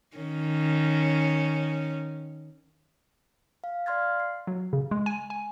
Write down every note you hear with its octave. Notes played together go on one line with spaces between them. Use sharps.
D#3 C#4
F5
D5 F5 C6 F6 G#6 A6
C7
F#3
C#3
G#3
G#5
G#5